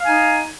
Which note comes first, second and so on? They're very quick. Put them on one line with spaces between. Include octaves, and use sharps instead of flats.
F5 G#5 D#4